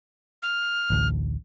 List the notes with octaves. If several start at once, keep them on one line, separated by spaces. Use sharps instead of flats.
F6
A1 D2